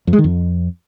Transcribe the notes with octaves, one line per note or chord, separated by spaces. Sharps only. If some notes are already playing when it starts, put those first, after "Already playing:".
F2
G#3
D#3
F2